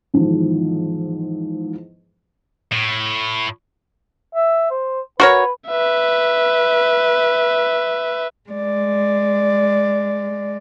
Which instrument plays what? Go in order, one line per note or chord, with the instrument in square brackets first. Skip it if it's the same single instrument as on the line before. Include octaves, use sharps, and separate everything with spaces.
[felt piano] E2 G#2 D#3 F3
[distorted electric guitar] A2
[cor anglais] E5
C5
[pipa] F#4 A#4 C#5 [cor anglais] B4
[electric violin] B4 E5
[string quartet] G#3 D5